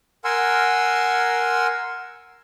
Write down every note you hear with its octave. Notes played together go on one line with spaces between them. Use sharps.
A#4 F#5 G#5 C6 E6